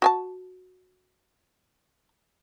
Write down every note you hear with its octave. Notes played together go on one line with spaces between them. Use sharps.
F#4 G#5 A5